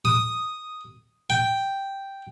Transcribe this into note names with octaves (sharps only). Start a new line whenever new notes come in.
D#6
G5